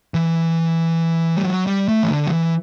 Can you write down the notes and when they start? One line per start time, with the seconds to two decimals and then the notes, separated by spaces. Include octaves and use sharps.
0.14 E3
1.37 G3
1.44 F#3
1.67 G3
1.88 A3
2.03 E3
2.10 D3
2.27 F#3
2.31 E3